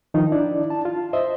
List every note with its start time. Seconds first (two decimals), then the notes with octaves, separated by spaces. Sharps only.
0.14 D#3 F3 D#4
0.32 D4 E4 D5
0.70 A5
0.85 F4
1.13 C5 D#5 E5